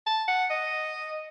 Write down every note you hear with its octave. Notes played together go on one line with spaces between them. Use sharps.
A5
F#5
D#5